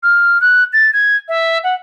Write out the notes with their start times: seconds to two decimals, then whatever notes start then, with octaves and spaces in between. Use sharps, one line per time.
0.03 F6
0.41 F#6
0.73 A6
0.93 G#6
1.28 E5
1.63 F#5